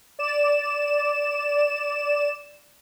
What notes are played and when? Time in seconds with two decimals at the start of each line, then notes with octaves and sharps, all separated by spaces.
0.19 D5 E7